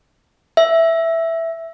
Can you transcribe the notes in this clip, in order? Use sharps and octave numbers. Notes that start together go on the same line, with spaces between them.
E5